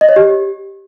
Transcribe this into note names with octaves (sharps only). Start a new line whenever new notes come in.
D#5
C#5
G4